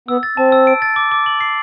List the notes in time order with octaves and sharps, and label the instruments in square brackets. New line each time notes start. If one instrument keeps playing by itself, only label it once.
[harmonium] B3 [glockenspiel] E6
[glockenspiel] A6
[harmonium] C4 [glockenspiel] A5
[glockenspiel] E6
D7
A6
D6
D6
F#7
C7